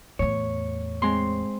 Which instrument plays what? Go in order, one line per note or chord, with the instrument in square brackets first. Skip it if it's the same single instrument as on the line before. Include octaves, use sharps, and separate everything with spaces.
[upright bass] E2 A2 [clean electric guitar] C#5
[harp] G#3 C4 C6